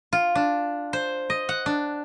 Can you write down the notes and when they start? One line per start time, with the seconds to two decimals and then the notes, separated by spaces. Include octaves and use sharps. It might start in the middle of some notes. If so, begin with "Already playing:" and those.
0.13 F4
0.35 D4
0.93 C5
1.30 D#5
1.49 F#5
1.66 D4